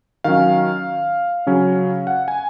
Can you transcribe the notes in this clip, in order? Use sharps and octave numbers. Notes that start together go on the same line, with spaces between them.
D#3 F#3 C#4 F5
C#3 F#3 C#4
F#5
G#5